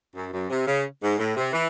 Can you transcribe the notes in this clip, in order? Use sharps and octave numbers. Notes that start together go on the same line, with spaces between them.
F#2
F#2
C3
C#3
G#2
A2
C3
E3